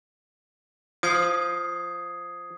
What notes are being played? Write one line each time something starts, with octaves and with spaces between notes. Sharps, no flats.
F3 D#6 G#6 C7